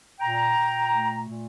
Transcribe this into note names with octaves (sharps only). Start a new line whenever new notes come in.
A#2 G5 A#5
A#2
A3
A#2